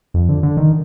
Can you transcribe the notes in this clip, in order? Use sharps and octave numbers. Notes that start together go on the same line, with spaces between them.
F2
D3
D3
D#3